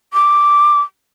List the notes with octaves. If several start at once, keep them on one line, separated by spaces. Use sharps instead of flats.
D6